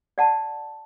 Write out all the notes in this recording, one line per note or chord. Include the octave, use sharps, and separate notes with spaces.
D5 F#5 A5